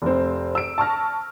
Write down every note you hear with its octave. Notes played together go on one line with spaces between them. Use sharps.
F1 C4
E6 D7
A5 C#6 F6 A#6